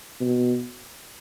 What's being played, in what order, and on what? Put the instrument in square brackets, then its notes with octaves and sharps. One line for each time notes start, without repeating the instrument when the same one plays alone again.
[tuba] B2